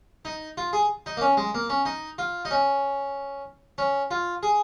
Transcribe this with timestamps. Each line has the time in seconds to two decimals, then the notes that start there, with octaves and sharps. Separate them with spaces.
0.25 D#4
0.57 F4
0.73 G#4
1.06 D#4
1.17 A#3
1.21 C#4
1.37 G#3
1.54 A#3
1.69 C#4
1.85 D#4
2.18 F4
2.45 D#4
2.51 C#4
3.78 C#4
4.11 F4
4.43 G#4